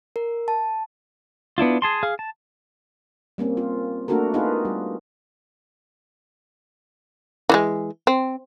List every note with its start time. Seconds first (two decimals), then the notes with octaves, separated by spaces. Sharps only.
0.16 A#4
0.48 A5
1.58 B3 D4 E4 F4
1.82 G#4 A5 C6
2.03 G#4 F5
2.19 A5
3.38 G3 A#3 C4 C#4
3.57 F4
4.08 A3 A#3 D4 F#4 A4 A#4
4.34 B3 D#4 F4 G#4 A#4 B4
4.65 G3
7.49 E3 F3 G#3
8.07 C4